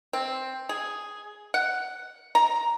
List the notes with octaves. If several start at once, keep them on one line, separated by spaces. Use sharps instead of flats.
C4
G#4
F#5
A#5